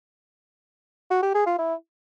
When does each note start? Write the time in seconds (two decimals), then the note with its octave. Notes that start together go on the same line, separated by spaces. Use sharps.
1.11 F#4
1.23 G4
1.35 G#4
1.47 F4
1.58 E4